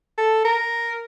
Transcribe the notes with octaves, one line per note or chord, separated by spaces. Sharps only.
A4
A#4